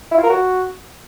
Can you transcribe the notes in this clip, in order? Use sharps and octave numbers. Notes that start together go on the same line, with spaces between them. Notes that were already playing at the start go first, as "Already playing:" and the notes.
E4
F4
A#4
F#4